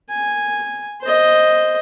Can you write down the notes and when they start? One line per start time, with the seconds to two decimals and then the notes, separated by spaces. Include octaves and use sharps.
0.10 G#5
1.02 C5 D#5